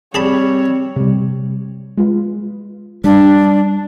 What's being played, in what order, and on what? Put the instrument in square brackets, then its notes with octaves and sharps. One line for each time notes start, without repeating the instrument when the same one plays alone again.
[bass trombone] G3 [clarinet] C4 [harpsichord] G#4 A5 B5 [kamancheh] C#5
[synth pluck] C3 G3
G#3 F4 B4
[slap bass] G3 [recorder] D4